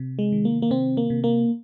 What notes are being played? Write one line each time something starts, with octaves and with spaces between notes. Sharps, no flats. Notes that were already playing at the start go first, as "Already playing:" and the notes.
Already playing: C3
G#3
D#3
A#3
A#3
C3 C4
A#3
C3
A#3